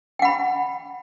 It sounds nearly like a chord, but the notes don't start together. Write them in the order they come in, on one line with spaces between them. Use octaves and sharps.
G5 F#5 B5